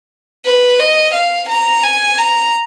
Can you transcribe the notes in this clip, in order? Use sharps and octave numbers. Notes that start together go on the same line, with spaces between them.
B4
D#5
F5
A#5
G#5
A#5